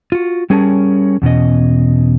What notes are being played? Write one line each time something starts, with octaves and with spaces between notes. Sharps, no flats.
F4 F#4
G3 C#4 G#4 A#4 C#5 A5
E2 B2 C#4 D#5